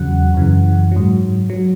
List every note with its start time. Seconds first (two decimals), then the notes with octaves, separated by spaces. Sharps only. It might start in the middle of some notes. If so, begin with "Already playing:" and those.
Already playing: E2 C#3 F#3 F#5
0.34 F#2 C#3 E3
0.92 G#2 F#3
1.50 F#3